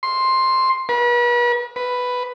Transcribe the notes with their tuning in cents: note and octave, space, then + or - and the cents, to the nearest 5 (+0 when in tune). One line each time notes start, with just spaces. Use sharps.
C6 +5
B4 -40
B4 +5